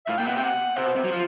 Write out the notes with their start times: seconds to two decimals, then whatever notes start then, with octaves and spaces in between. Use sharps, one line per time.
0.06 E5
0.09 A2 F5
0.18 A#2 G5
0.27 B2 F#5
0.35 C3 G5
0.44 F#5
0.77 C3 C5
0.86 B2
0.95 C3
1.04 F#3
1.12 F3